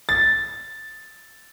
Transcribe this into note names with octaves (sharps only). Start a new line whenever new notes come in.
A6